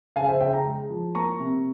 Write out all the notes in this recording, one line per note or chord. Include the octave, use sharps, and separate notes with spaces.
C#3 F5 G#5
C5 E5
C#3 E5 G5
G5 A#5
G#3
F3
A#3 A#5 C#6
C3